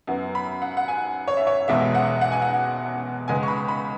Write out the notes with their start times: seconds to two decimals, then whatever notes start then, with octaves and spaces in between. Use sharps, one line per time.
0.07 F#2 F#3 B3
0.35 B5
0.62 F#5
0.77 F#5
0.88 G#5
1.28 C#5
1.37 E5
1.47 C#5
1.68 E1 E2 B2 G#3 E5
1.95 F#5
2.21 F#5
2.32 G#5
2.42 F#5
3.28 C#2 C#3 G#3 B3 G#5
3.43 C#6
3.48 B5
3.68 B5